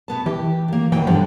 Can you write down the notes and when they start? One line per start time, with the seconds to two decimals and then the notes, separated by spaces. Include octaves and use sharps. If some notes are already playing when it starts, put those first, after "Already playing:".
0.08 B2 B3 A5
0.26 E3 G4
0.68 D#3 A#3
0.92 D#2 B2 E3 G5
1.07 G2 D3 F3 G3